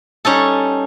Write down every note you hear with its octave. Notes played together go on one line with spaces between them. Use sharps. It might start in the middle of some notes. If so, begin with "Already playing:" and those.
G3 C#4 D#4 A4